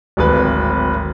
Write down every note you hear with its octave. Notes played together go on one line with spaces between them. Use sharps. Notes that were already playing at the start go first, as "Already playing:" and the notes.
D1 G#1 B4